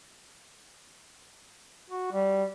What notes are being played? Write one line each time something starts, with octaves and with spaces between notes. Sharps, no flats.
F#4
G3